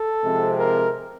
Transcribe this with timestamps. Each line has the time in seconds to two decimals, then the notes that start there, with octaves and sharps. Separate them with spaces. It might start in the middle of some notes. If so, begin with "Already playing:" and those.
Already playing: A4
0.24 C3 F3 G#3 C4
0.58 A#4